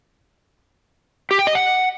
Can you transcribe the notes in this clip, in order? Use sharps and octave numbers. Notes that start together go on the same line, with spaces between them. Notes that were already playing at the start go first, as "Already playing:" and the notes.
G4
G5
D#5
F#5